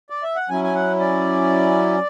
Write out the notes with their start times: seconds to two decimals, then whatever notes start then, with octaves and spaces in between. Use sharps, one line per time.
0.10 D5
0.23 E5
0.36 F#5
0.49 F#3 C#4 E4 G#5
0.64 G#5
0.75 F#5
1.00 D5